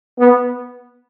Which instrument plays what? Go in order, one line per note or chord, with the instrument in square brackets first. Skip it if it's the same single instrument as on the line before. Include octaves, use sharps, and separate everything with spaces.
[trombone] B3